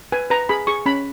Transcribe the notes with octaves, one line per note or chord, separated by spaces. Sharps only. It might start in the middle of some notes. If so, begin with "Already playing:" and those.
B4 G#5
B4 A#5
G#4 B5
G#4 C#6
C#4 B5